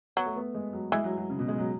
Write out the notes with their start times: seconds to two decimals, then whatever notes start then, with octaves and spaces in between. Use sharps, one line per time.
0.17 F#3 B3
0.26 A3
0.36 B3
0.54 G#3
0.73 F#3
0.92 E3 G#3
1.04 F#3
1.17 F#3
1.30 C#3
1.39 B2
1.48 G#3
1.58 F#3